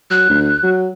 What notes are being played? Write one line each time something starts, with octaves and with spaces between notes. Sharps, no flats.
F#3 F#6
D2
F#3